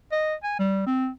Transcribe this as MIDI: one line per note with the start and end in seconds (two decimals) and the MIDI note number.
0.12 0.35 75
0.44 0.57 80
0.59 0.86 55
0.87 1.09 60